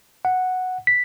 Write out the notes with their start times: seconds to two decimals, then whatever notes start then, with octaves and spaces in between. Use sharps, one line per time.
0.25 F#5
0.87 B6